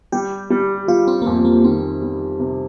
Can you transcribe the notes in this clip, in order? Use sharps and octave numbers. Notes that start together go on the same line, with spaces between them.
G3 G4
G3
G3 F4
C4
A#3
F2 C4
A#3
D#3 C4
G3
C3